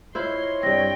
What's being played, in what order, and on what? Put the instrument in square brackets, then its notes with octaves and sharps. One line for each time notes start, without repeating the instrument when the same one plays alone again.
[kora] E4 F4 C5 [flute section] C#5 D#5 [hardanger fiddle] C6
[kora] G2 C4 [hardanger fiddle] G5 [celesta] A#6